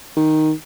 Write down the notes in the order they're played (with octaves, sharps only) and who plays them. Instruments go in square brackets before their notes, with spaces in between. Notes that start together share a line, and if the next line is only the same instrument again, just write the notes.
[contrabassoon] D#3